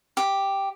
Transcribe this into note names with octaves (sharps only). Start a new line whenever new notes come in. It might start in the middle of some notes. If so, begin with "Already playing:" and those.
G4